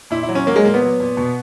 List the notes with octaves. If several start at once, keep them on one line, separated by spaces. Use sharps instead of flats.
A#2 E4
E4
F#3
C#4
F#3 A#3
G#3
A#2 A#3
B3
F#3
A#2
B2